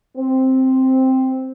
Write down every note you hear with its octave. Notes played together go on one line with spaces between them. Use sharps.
C4